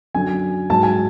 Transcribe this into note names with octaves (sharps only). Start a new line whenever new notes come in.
F#2 D3 F#3 G#5
G#2 F#3 A5
G#5